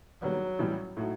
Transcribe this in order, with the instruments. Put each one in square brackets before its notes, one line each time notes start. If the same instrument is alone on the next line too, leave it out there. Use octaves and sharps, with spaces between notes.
[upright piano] E1 D#2 D#3 G3 B3 [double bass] F#3
[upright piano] A1 A2 E3 G3
A2 F#3 A3 D#4 F#4